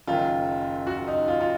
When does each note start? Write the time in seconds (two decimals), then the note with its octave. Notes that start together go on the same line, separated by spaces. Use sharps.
0.07 F#1 F#2 D#3 F4
0.87 F#4
1.07 D#4
1.28 F4
1.41 F4